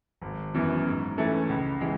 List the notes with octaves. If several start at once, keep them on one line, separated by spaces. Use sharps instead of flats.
G#1
F#2 E3 B3
G#2
E3 A3 C#4
C#2
E3 G#3